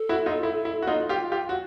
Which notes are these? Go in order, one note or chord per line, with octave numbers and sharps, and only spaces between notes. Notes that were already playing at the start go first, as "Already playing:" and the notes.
Already playing: A4
E4 F#4
D#4 F4
E4
E4
F#4
D#4 F4
F4 G4
F4 G4
F#4